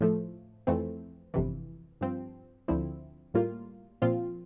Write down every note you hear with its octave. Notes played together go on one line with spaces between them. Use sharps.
A2 F3 A3
F2 E3 A3 C4
G1 F2 C3 E3
G2 F3 C4
D2 D3 F3 C4 E4
A2 G3 A#3 F4
A#2 F3 C4 F4